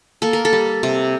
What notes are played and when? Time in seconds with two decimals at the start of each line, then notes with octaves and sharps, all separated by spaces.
0.22 A#3 A4
0.33 A#4
0.45 A4
0.53 G3
0.83 C3